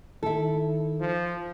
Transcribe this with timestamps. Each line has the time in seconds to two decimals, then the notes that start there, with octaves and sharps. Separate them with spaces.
0.23 D#3 E4 A4
1.00 F3